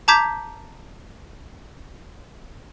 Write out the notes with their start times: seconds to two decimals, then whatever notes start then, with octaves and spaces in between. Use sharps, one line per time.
0.08 A5 A#5 D6 G6 G#6 B6